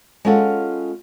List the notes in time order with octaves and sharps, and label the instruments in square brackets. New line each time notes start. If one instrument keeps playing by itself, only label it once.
[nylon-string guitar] G#3 B3 C#4 F4 A4 F#5